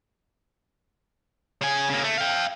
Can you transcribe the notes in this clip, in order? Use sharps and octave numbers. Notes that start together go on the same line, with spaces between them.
C#3 G#5
C#3 A#3
A3
F5 G5